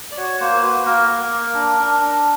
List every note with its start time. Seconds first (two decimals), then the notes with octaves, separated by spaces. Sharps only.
0.12 D5
0.17 F#4 C#5
0.40 A#3 C5
0.62 F#4 B4
0.85 A#3 A#4
1.09 A#3
1.32 A#3
1.54 D4
1.77 D4
2.00 D4